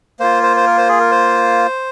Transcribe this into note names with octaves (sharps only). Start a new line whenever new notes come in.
A#3 F4 C5
C5
C5
A#4
C5
G#4
A#4
C5